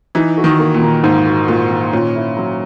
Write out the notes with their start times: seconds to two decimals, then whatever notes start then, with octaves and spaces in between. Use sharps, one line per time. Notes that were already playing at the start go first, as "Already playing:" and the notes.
0.15 E3 D#4
0.37 F#4
0.44 D#3
0.59 A#3
0.74 A#2
0.82 D#3
1.03 G#2 D#4
1.26 F#4
1.48 A#2 A#3
1.71 D#3
1.92 A#2 C#4
2.16 E4
2.37 F#3